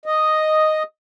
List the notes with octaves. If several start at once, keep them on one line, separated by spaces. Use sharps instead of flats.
D#5